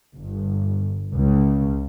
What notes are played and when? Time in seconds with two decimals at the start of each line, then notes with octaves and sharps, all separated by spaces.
0.16 G1
1.13 C#2 C#3